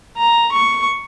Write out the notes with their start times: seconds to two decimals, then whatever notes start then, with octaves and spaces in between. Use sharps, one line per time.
0.17 A#5
0.52 C#6